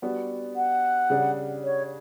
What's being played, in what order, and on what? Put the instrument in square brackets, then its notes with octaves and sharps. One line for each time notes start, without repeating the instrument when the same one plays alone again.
[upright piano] G3 B3 D4 F#4
[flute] F#5
[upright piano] C#3 G3 D4
[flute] C#5